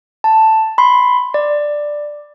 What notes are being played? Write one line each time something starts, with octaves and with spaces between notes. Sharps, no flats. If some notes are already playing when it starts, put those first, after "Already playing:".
A5
B5 C6
D5